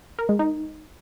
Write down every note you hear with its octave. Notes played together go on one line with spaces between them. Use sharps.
A#4
G#3
D#4